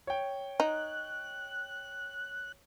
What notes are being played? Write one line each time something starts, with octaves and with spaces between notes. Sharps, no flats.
C#5 G5
D#4 F#6